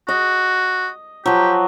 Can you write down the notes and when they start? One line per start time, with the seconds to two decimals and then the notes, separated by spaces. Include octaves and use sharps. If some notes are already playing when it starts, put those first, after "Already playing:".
0.08 F#4 D#5
1.26 F3 F#3 G4